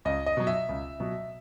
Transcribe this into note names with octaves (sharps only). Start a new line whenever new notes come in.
C#2 D#5
D#5
B2 F#3
E5
C#2
B2 F#3